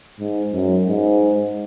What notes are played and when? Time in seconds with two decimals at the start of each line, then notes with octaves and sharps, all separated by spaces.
0.20 G#2
0.53 F#2
0.87 G#2